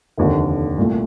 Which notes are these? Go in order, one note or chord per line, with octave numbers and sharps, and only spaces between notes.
F1 D#2 D3
C2 A#2 A3